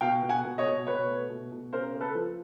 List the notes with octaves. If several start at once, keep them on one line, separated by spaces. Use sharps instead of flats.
B2 F5 G5
B2
F#5 G#5
B2
C#5 D#5
B2
B2 B4 C#5
A3
B2
B2
C#3 A#4 C5
A#3
A4 B4
F3